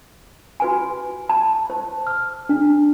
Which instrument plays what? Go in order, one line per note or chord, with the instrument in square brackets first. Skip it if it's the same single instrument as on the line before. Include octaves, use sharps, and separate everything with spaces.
[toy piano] F#4 B4 G#5
A5
C5
[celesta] F6
D4